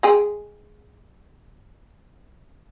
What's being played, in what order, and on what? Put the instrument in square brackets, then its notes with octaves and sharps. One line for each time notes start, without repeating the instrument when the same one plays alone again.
[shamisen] G#3 G#4 G5